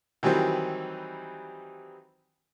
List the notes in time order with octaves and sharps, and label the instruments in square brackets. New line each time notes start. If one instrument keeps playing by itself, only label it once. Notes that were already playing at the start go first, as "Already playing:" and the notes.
[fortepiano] D#3 E3 F#3 G3 C4